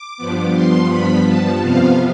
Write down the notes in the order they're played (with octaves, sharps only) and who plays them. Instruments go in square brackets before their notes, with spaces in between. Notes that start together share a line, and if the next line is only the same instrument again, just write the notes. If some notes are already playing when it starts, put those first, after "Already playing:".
Already playing: [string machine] D6
G2 F3 B3
C6
B5
A5
F2 C3 F3 B3 F5